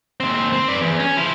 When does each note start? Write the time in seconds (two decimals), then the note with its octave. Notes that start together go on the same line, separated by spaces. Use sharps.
0.20 D#2 C4
0.53 C4
0.68 B4 D5
0.81 E2
0.99 C#4
1.17 F3 E4